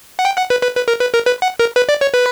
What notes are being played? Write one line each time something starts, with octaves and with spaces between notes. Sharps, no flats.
F#5
G5
F#5
B4
B4
B4
A#4
B4
A#4
B4
F#5
A#4
B4
D5
C#5
B4